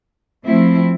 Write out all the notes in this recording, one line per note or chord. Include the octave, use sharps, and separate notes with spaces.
F3 A3 C4 E4